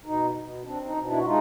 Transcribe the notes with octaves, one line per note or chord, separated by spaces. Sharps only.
B2 D#4
B2
C4 D4
D#4
B2
D4 E4
F#4
G#3 D#4 F4